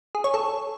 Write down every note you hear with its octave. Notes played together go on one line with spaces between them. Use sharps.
G#4
C#5
A4